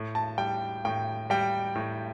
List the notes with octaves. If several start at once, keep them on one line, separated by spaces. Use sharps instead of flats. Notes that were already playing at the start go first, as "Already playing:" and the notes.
Already playing: A2
A5
G3 G5
A2 G5
G3 G5
A2